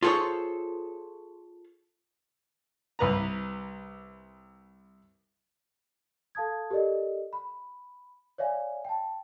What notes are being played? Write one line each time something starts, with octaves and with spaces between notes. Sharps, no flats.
F4 G#4 A4 C5 C#5
C2 B4 A#5
A4 F5 A5 D#6 G#6
G4 A4 A#4 D5 D#5
B5
C#5 D5 E5 F5 G#5
G5 A5